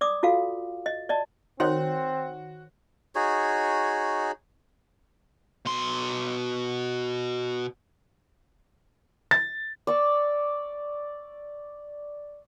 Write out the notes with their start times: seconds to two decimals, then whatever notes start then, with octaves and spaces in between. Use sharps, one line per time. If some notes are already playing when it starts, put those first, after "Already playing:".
0.01 D5 D6 D#6
0.23 F4 F#4 A4 F5
0.86 D#5
1.09 D5 D#5 A5
1.60 D#3 C4 F#4 C5 C#5 C6
3.15 D#4 F#4 G#4 C#5
5.66 B2 C6
9.31 A6
9.87 D5 C#6 E6